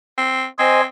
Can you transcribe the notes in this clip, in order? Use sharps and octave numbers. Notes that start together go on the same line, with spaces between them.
C4
C4 C5 D#5 G#5